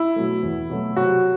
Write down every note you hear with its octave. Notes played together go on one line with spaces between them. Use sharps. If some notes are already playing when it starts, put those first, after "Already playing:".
Already playing: E4
B2 F#3 A3
E2
B2 F#3 A3
C3 F#3 F#4